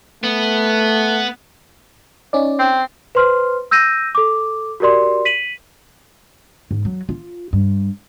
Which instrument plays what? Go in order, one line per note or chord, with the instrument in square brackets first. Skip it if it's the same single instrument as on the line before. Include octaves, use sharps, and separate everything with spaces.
[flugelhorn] A3 [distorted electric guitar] B3
[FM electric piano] C#4 D#4 D5
[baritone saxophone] C4
[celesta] B4 C5 C6 F6
E6 G6 A#6 D#7
A4 D6
F#4 G4 A#4 D5 C6
B6 D#7 F#7
[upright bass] G#2
F#3
F4
G2